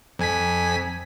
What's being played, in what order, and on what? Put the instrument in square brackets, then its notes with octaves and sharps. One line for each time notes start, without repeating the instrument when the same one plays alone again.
[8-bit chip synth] F2 G#5 B6